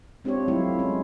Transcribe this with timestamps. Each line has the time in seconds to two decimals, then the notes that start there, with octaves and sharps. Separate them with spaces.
0.24 G#3 C4 D4 F4 G4 C#5
0.48 F#3 A3 E4 F4
0.79 G#3 C#4